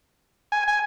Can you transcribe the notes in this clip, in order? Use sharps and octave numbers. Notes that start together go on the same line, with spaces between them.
G#5
G#5